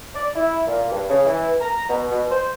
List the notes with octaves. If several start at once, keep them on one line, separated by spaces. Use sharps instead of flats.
D5
E4
A#2
G2
C#3
E3
A#5
B2
B2
C5